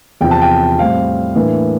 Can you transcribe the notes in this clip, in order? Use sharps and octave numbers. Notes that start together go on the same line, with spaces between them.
E2 C3 F3 G5
A5
G5
A2 G3 C4 F5
A2 E3 A#3 D4